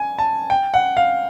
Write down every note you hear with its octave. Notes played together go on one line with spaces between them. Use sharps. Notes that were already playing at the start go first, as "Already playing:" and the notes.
Already playing: G#5
A5
G5
F#5
F5